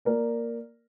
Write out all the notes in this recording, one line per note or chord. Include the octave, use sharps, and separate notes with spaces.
A#3 A#4 D5